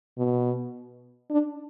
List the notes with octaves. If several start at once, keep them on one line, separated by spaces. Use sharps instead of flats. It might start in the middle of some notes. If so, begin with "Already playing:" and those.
B2
D4